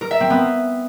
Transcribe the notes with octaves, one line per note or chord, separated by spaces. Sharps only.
A#4
E5
C4
B3